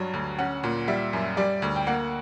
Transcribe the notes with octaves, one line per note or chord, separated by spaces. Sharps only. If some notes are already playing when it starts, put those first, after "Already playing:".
Already playing: G2 F#3 G3
D2
C#4 F#5
A#2
G3 E5
F#2
G3 D5
D2
G5
A#3 F#5